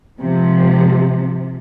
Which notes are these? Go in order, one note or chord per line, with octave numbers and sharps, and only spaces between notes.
G#2 C3 F3